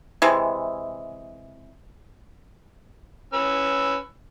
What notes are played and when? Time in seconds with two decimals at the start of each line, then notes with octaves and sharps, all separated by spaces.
0.22 C3 E3 G#3
3.33 C#4 B4 E6